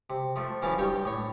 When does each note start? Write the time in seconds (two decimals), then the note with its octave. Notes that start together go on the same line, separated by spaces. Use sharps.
0.10 C3
0.36 F3 A3
0.62 B1 E3 F3 C#4 F5 D6
0.78 G2 G4 C#5 G5
1.05 A2 C#5